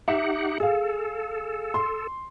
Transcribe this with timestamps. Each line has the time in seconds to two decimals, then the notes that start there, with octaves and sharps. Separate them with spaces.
0.08 D#4 G4 E5 F#5
0.60 G#4 A4 F5
1.74 C6